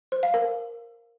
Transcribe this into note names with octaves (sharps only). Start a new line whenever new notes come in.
C5
F5
A#4